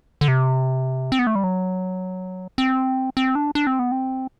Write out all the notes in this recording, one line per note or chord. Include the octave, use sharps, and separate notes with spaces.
D3
C3
C4
B3
A3
G3
F#3
C4
C4
D4
D4
C4
B3
C4